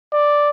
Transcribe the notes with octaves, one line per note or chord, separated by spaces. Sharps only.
D5